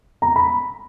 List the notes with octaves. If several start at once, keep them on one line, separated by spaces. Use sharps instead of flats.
A#5
B5